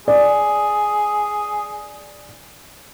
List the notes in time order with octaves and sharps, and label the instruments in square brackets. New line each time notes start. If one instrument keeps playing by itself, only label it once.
[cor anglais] G#4 [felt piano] D5